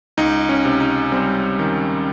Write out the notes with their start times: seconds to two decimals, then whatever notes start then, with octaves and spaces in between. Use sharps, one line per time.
0.17 C#2 D#4
0.49 C#4
0.65 C3
0.80 D#4
1.12 G3 C4
1.59 D#3